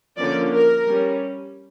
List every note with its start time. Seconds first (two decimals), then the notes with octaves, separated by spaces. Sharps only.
0.18 D3 F3 A#3 C#4 D5
0.53 A#4
0.87 G3 C#4